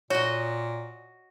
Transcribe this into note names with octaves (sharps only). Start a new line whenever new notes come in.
A#2 F#4 C#5 D#5